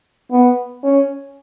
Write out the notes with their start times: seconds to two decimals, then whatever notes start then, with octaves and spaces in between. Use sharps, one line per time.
0.31 B3
0.83 C#4